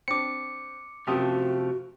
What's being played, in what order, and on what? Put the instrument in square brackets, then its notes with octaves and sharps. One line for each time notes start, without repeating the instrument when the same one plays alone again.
[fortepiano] C4 D4 [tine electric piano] D6 C#7
[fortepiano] F#2 G4 D#6 [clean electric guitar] C3 F3 A3 [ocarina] F#4